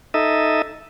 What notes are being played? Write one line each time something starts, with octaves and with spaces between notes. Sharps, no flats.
D#4 A4 D#5 E5